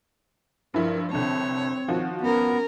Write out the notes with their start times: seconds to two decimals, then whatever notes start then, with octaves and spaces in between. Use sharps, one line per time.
0.74 G2 F3 E4 A#4
1.11 C2 D3 C4 C#5 A5
1.88 D#3 F3 F#4
2.21 B3 C#4 A#4